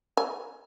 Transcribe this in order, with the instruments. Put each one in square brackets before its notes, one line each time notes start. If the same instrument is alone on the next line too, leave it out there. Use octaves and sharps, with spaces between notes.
[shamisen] G#5